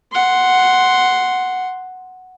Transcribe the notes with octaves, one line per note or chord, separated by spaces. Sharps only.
F#5 C6